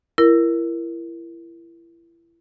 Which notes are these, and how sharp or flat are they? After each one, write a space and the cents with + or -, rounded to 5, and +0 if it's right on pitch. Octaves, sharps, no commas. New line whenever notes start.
E4 +30 A#4 +5